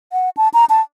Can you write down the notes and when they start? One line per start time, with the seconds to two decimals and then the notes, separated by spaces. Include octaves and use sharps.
0.13 F#5
0.37 A5
0.54 A#5
0.70 A5